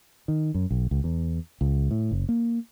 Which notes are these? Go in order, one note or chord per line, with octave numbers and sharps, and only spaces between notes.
D#3
F#2
B1
C#2
E2
C#2
A2
F#1
A#3